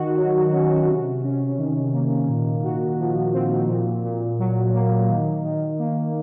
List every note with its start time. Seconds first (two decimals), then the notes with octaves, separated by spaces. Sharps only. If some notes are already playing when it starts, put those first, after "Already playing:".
Already playing: D#3 F#4
0.17 F#3
0.52 C#4
0.87 C3
1.23 C#4
1.58 D#3
1.93 A#3
2.29 A#2
2.64 F#4
2.99 F3
3.33 C4
3.69 A#2
4.04 A#2
4.39 F#3
4.74 A#3
5.09 D#3
5.45 D#3
5.79 A#3